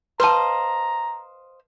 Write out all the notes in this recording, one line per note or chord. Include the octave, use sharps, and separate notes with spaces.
B4 C5 D#5 F5 A5 A#5